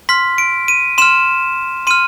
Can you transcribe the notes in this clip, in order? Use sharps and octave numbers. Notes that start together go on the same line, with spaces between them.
C6 F6 B6
D7
D#7
C6 F6 E7
C6 F6 D#7